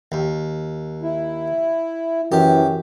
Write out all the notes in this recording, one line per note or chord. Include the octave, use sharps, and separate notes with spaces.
D#2
E4
F#2 E3 G4